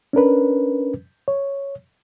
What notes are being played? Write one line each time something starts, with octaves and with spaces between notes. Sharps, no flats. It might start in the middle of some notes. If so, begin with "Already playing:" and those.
C#4 D4 A#4 B4
C#5